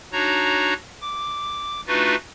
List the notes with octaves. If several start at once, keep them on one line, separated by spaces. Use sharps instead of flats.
D4 D#4 F#4 C#5 A#5
D6
A3 D4 D#4 F4 F#4 B4